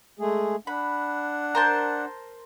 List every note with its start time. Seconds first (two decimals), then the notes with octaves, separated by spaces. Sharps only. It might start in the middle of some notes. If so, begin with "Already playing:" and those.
0.19 G#3 A3 G#4
0.67 D4 F#5 B5
1.55 A#4 C5 A5